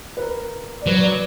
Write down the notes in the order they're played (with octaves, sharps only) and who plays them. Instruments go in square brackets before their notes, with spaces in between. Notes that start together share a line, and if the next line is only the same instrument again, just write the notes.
[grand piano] B4
A#4
D5
[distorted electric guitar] F#3 [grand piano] B4
[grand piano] D5